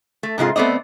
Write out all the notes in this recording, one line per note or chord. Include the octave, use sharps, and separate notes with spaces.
A3
G#2 C3 G#3 F4
A3 B3 C4 D5 D#5